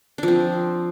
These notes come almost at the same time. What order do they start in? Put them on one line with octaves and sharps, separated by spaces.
D4 F3 C4